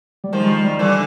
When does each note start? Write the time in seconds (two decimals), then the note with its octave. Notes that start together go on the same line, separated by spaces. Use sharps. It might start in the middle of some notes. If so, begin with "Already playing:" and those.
0.24 G3
0.33 D#3 F3 G#3
0.64 G3
0.79 D3 E3